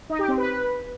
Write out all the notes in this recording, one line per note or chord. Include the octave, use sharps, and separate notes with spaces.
D#4
G4
C4
B4